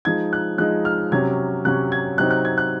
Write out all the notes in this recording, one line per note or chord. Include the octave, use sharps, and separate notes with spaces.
F3 G#3 D#4 G#6
F#6
F3 G#3 D#4 F#6
F6
C3 F#3 C#4 G#6
C3 F#3 C#4 F#6
G#6
C3 F#3 C4 D#4 F#6
F#6
G#6
F#6